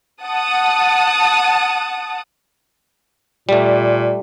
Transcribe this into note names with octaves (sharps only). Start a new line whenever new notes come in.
F#5 A5 D#6
A#2 G3 A3